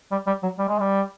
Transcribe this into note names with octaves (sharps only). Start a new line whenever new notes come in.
G3
G3
F#3
G3
G#3
G3